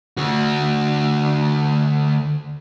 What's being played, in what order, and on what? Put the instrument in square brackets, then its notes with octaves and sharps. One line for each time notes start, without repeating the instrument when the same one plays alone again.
[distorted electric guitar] D2 F#4